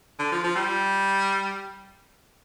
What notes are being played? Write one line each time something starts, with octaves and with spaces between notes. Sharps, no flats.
D3
F3
F3
G3